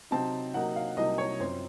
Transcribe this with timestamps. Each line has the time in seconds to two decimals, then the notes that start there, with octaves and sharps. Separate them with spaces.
0.11 C3 F#3 C4 D#4 A5
0.54 C3 F#3 A#3 D#4 F#5
0.76 F5
0.97 C2 C3 F#3 A#3 D#4 D#5
1.18 C#5
1.40 F#2 F3 C4 C5